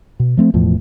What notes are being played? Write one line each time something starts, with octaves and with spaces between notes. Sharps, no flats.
B2
F3 A3 C4
E1 E2 A2 F3